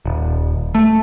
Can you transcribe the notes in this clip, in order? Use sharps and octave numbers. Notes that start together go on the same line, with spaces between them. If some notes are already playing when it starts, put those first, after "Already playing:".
D#1
A3